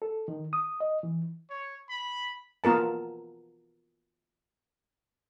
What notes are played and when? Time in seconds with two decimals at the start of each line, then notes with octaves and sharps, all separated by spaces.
0.02 A4
0.28 D#3
0.53 D#6
0.80 D#5
1.03 E3
1.50 C#5
1.90 B5
2.64 B3 F4 A#4 A5